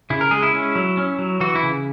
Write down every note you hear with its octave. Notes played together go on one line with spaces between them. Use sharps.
C#3 E4
A#4
G#3 G#4
E4
C#4
F#3
C#4
F#3
E3 F#4
E4
C#3